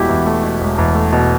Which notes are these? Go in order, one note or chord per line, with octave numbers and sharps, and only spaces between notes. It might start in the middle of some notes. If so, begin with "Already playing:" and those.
Already playing: E1 B2 A3 E4 F#4 G4
E2
A3
B2
E1
E2
A3
B2